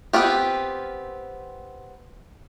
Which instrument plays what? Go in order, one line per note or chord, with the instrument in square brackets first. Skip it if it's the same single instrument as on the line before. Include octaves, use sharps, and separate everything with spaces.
[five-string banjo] B3 C4 F4 G4